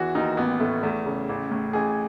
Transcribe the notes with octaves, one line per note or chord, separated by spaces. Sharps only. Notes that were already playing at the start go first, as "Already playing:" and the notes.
Already playing: E2 E3 F#4
D#2 D#4
A1 B3
A2 A3
E2 A3
C#3
A1
A2
A1 G#4